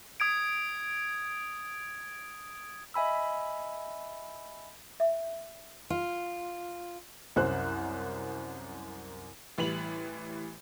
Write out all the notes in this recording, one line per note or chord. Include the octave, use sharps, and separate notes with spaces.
D#6 G#6 D7
D#5 E5 G#5 B5 E6
E5
F4
C2 F#2 C5 F#6
A1 E3 G3 B4 F7 F#7